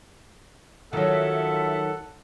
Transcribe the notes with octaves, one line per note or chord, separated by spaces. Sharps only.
D#3 F#3 F4 A4 E5 F#5